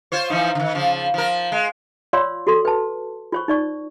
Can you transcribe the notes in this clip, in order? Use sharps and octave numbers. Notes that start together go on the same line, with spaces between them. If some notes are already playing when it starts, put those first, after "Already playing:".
F4 C5 C#5
E3 F3 D#4
D3 D#3
C#3 F3
F3 A#4
G#3
F4 C#5 D5 F5 C6 E6
F#4 A4 C6
B4 A5
F4 C5 C#6
D#4 D5 C#6